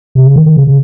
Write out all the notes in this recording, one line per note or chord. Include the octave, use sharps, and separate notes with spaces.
C3
C#3
D#3
D#3
C#3
C#3